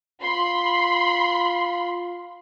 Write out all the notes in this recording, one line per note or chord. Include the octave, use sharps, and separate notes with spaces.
F4 B5 C6